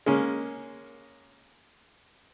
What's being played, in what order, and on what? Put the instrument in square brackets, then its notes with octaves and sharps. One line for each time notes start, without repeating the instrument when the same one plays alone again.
[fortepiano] G#3 A#3 C#4